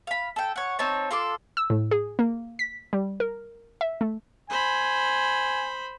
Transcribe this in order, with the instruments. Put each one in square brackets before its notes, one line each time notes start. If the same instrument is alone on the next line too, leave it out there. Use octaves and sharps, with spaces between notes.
[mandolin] F5 B5
A4 G5
C#5 F#5
C4 D#4 C#5 A5
F4 A4 C6 D6
[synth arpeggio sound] E6
A2
G#4
A#3
B6
G3
A#4
E5
A3
[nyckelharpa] C5 B5 [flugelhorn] G#5